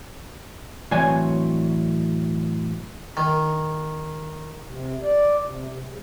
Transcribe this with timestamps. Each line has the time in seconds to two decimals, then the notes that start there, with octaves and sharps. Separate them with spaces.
0.91 A2 E3 F#3 C4 C#5 G#5
3.17 D#3
4.67 C3
5.03 D5
5.43 C3
5.69 C3
5.85 G#2